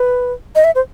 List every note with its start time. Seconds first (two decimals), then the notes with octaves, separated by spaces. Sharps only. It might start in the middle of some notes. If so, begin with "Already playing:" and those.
Already playing: B4
0.55 D#5
0.64 E5
0.75 C5